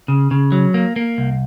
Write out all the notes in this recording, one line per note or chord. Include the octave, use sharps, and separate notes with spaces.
C#3
C#3
F#3
A#3
A#3
C2